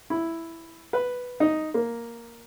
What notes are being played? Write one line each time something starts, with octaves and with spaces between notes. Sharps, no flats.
E4
B4
D#4
A#3